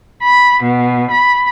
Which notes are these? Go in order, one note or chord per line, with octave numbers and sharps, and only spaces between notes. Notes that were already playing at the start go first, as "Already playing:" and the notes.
B5
B2
B5